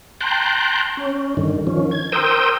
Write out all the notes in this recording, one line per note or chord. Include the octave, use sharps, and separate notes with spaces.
G5 A5 A#5 C6 F#6 G6
C#4
G2 D3 D#3
D#3 F3 C#4
G#6
A#4 C5 G5 D#6 E6 G6